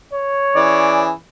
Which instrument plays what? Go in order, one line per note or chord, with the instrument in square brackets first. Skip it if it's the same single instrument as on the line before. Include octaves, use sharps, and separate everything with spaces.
[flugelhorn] C#5
[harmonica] E3 C#4 G#4 [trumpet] D5